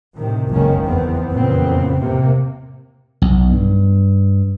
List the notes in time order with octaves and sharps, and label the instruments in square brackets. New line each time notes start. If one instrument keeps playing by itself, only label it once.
[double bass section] A2 C3 D#3
F#1 C#2 D#3 A#3 C#4
E2 B3 C4
F1 E2 A#2 C#3 B3 C4
A2 C3 A#3
[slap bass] B1
G2